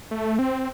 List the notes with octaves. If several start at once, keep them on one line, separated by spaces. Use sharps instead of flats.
A3
C4